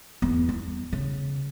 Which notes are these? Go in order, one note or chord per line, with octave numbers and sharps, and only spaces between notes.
E2 B3
G3
C#3